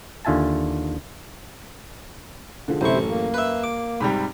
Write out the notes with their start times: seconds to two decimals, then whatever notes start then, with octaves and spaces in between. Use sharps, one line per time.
0.25 D#2 D3 F4 E5 G#5 A5
2.68 D3 F3 G#3
2.81 A1 F#2 C3 E4 C5 C#6
3.08 A#3
3.34 B4 E5
3.64 D6
4.00 G#2 C3 G3 B5